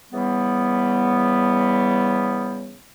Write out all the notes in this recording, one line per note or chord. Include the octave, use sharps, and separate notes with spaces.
C#3 E3 G3 B3